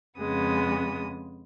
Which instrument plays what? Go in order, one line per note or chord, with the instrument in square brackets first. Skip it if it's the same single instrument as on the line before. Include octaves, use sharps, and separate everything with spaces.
[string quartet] F2 C#3 G#3 B3 D#6